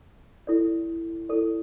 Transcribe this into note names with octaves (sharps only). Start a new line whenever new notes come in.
E4 A4 D5
E4 A4 D5